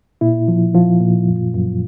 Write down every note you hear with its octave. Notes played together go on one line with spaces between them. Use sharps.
A#2 E4
F3
F3 F4
A#2
F#2
F#2